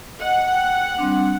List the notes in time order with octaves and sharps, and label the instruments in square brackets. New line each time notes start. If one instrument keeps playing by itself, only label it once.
[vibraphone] D#5 [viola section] F#5
[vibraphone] G5
G3 C4 D4